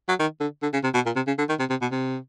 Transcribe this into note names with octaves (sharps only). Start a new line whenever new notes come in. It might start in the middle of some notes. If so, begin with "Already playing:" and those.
F#3
D#3
D3
D3
C#3
C3
B2
A#2
C3
C#3
D3
D#3
C3
C3
B2
C3